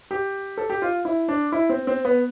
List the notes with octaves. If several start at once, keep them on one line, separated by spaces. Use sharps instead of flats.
G4
A4
G4
F4
E4
D4
E4
C4
C4
B3